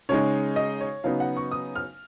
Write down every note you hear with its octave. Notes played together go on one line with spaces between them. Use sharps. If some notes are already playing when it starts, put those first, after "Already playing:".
C#3 G#3 D#4 C#5
D#5
C#5
C#3 F#3 B3 D#4 F5
F#5
C#6
D#6
F6